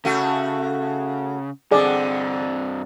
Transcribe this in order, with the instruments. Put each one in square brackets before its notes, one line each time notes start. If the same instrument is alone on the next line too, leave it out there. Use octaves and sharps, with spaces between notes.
[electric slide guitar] C#3 [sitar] A3 F#4
[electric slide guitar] G2 C4 [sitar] D3 [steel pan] G#4 D5